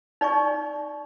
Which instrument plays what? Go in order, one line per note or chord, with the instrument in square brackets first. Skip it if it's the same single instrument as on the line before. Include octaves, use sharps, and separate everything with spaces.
[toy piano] D#4 D5 G#5 C#6